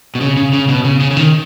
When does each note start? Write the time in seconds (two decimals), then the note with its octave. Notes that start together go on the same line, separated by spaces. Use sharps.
0.15 B2
0.21 C#3
0.37 C#3
0.53 C#3
0.69 B2
0.85 C#3
1.00 C#3
1.11 C#3
1.17 D#3